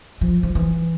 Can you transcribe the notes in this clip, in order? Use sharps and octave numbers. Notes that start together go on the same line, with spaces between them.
F3
F3
E3